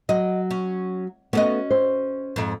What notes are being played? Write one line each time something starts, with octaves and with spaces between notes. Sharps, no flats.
F#3 D#5
C#4
A3 B3 C#4 F#4 D#5
C5
F2 G#2